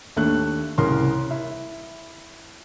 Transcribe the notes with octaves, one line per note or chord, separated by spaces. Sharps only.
D#2 A3 D4 F#6
C2 C#3 A#4 C6
E4